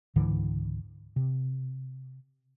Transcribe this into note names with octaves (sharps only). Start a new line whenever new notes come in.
C#2 G#2 D3 E3
C3